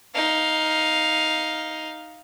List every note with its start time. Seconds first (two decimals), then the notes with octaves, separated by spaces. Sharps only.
0.14 D#4 F5